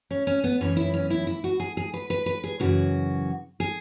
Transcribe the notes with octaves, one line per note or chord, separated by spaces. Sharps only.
C#4
C#4
B3
F#2 E3 B3 C#4
E4
C#4
E4
E4
F#4
G#4
G#4
B4
B4
B4
G#4
F#2 C#3 E3 F#4
G#4